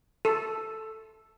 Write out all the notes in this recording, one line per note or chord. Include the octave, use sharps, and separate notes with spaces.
A4